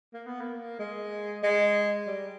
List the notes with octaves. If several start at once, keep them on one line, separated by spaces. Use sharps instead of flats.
A#3
B3
A#3
G#3
G#3
G3